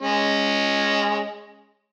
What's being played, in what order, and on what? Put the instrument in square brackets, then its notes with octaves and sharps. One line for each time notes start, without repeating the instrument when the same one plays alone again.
[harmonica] G#3 C#4